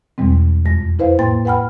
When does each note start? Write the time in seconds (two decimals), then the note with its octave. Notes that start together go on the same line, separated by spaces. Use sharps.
0.18 E2 B2 G3 G#3 C4
0.66 F2 G#3 A#6
0.99 E4 B4 C5 F5
1.19 A2 A#3 G5 C6 A6
1.45 B4 F#5 G5 B5 F6